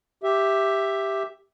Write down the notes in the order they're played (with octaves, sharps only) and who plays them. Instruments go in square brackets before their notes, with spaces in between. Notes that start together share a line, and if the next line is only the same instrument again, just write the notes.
[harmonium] G4 E5